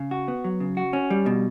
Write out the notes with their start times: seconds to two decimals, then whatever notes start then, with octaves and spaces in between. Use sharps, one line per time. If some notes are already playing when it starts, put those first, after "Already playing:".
Already playing: C#3
0.11 F#4
0.28 B3
0.44 F#3
0.60 C#3
0.77 F#4
0.93 C#4
1.10 G3
1.26 B2